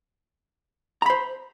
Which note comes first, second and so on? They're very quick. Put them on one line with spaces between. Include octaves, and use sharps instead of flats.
A#5 B5 C5